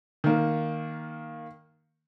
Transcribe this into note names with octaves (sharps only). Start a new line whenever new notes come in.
D#3 A#3